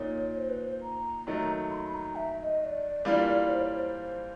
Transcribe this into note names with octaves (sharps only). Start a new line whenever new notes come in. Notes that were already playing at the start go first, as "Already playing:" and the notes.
Already playing: A#2 A#3 D#4 C#5
C5
B4
C5
A#5
D#3 F#3 A3
C6
B5
A#5
E5
E5
D#5
D#5
D5
E3 G3 A#3 D4 F4
C5
C#5
C#5
C5